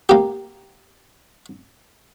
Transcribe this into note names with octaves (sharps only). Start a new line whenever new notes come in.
A#3 G4